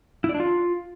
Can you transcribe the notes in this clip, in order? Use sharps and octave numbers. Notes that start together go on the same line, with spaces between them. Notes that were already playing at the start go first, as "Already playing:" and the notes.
E4
D5
D4
F4